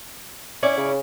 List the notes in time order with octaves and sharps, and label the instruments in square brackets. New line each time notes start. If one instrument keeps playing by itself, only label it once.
[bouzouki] C#4 E4 D5
[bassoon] C#3